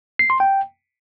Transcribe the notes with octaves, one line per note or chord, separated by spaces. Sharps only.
C7
C6
G5